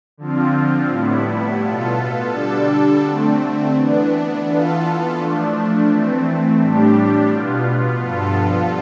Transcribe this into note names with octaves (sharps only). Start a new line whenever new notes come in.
D3 F3 C4 F4
A2 G3 B3 E4
B2 B3 F4 A4
D3 G3 D4 A4
D3 A3 C4
E3 B3 D4
E3 B3 F4 A4
F3 A3 D4
E3 A3 C4
A2 G3 D4 G4
B2 B3 F4
G2 F3 B3 F4 A4